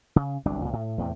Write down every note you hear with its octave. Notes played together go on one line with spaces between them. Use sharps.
C#3
G1 C2 F#3 D4
C#2 A#2
A2
E2 A2 C3